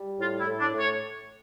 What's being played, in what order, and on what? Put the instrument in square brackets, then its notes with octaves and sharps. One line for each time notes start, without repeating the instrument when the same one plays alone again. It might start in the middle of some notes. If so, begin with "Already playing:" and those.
Already playing: [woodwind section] G3
A2 F4
E4
A2
D4
A2
C#5